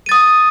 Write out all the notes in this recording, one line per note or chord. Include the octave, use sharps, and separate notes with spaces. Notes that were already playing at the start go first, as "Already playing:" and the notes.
D#6 A6 D#7